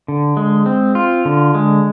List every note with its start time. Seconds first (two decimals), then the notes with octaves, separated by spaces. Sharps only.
0.08 D3
0.37 G#3
0.66 C4
0.95 F4
1.25 D3
1.55 G#3